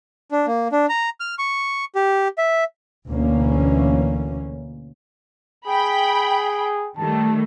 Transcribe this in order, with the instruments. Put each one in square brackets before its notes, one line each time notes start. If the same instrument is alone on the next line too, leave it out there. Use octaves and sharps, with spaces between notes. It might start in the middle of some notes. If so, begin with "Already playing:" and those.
[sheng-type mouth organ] D4
A#3
D4
A#5
F6
C#6
G4
E5
[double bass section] D2 B2 E3 A#3 C#4
[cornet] G#4 [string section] G5 B5
[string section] D#3 G3 A3 [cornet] A5